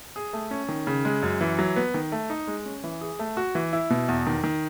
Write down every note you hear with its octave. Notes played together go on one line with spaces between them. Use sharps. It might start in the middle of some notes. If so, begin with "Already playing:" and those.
G#4
A3
C#4
D#3
C#3
G#3
F#2
E3
F#3
B3
D#3
A3
D#4
G#3
C#4
E3
G#4
A3
F#4
E3
E4
B2
E2
D#3
D#3